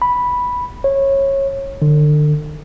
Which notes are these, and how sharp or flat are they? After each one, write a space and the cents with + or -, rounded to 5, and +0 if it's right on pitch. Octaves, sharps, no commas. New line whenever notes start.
B5 -5
C#5 -20
D3 +35